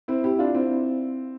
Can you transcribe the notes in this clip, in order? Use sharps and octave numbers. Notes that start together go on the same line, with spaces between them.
C4 E4
E4 G4
D4 F4
C4 E4